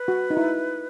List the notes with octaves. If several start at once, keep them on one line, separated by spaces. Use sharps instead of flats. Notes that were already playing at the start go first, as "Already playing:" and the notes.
Already playing: B4
F#4
D#4
E4